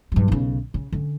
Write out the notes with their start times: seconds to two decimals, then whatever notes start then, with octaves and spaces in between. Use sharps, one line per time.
0.12 G2 F#3
0.28 B1 C#3
0.74 C#3
0.92 D3 C#4